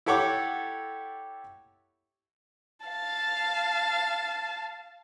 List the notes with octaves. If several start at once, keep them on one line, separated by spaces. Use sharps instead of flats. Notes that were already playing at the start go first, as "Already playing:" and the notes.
E4 G4 A4 C#5 F#5 D6
F5 A5